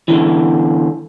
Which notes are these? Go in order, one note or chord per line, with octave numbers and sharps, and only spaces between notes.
E2 D3 E3